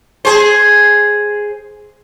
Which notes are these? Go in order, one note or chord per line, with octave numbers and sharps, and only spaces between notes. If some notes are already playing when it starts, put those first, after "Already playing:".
G#4 C5